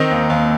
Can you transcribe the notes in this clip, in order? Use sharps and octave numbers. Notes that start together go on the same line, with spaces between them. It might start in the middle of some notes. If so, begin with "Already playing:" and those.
Already playing: D#3 C4 D#4
D#2
D#2